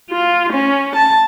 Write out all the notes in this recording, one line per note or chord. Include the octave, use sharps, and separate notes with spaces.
F4
C#4
A5